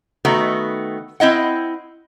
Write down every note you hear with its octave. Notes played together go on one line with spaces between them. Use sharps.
D#3 A3 B3 F#4
C4 E4 D#5 F#5